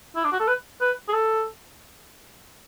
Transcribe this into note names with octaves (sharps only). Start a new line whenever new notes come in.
E4
D4
F#4
A4
B4
B4
G#4
A4